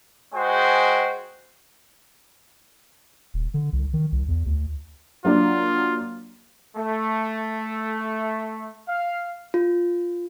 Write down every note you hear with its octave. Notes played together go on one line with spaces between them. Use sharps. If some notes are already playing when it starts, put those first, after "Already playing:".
G#3 F#4 G#4 C5 G5
D#1
D3
C2
D#3
C2
E2
D2
F#3 A#3 D4 F4
A3
F5
F4